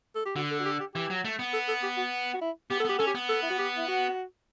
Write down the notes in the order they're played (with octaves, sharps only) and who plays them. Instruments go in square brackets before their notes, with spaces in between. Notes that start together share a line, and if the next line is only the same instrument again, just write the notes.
[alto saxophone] A4
G4
[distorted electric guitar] D3 [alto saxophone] F#4
[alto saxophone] A4
F#4
G4
G4
[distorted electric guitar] E3 [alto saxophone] G4
[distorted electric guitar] F#3
A3
B3
[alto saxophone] A4
A4
G4
F#4
F#4
E4
[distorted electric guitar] B3 [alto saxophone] G4
[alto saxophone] A4
[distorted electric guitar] B3 [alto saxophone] G4
[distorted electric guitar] C#4 [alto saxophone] A4
[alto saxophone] G4
[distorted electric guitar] B3
[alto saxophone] A4
E4
F#4
G4
E4
F#4